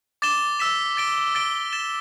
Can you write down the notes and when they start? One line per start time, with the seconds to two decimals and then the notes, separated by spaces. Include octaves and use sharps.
0.22 D6 A6 E7 G7
0.59 E6 B6 E7
0.97 A6 D7 G7
1.35 A6 D7 G7
1.73 A6 E7 G7